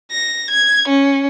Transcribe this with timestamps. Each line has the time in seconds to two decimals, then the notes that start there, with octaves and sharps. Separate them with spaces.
0.11 A#6
0.50 G#6
0.88 C#4